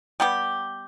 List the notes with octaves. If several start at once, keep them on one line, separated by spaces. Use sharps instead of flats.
G3 B3 G4